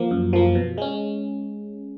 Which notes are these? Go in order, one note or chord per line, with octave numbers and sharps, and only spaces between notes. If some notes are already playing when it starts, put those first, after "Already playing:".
Already playing: F3 A#3
F#2
F3 A#3
B2
G#3 C#4